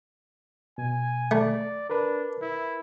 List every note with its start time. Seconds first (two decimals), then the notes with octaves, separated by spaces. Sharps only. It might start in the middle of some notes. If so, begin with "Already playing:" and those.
0.78 B2 G#5
1.31 A3 D5
1.90 D4 A#4 B4
2.41 E4